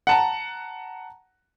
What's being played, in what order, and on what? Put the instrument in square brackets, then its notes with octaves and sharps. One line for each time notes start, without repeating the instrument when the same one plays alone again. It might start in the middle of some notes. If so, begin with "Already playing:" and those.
[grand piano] F#5 A5 A#5